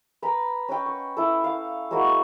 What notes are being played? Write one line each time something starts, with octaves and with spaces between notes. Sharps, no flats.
B4 A#5 B5
C#4 B4 D#5 G5
C#6
E4 A4
F5
G#3 A#3 E4 F#4